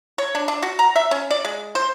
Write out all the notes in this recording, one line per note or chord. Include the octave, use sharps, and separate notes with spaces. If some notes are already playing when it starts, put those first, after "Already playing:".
C#5
D4
D4
F#4
A#5
E5
C#4
D5
G#3
C5